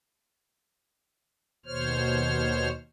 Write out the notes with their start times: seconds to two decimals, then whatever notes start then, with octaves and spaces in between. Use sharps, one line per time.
1.66 D#2 B2 C5 C#5 F6